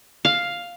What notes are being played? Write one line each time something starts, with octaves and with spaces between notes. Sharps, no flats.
F5